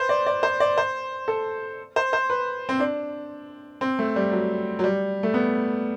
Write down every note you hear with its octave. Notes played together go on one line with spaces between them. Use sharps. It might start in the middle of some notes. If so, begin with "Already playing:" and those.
Already playing: B4 C5
D5
D5
C5
D5
C5
A4
C5
C5
B4
C4
D4
C4
A3
G3
F#3
F#3
G3
A3
B3